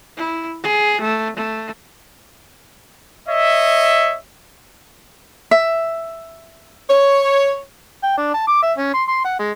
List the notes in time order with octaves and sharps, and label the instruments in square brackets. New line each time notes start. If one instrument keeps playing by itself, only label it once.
[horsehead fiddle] E4
G#4
A3
A3
[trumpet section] C#5 D#5 E5
[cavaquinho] E5
[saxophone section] C#5
[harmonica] G5
D4
A5
D6
E5
C#4
C6
C6
F#5
G#3